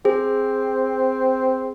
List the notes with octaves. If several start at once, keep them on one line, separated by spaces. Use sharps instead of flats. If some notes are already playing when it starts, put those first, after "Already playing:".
C4 G#4